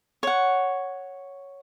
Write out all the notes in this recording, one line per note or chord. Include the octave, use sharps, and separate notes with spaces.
C#5 F#5